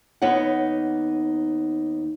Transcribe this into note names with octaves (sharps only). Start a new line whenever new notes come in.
D#2 B3 D#4 C#5 F#5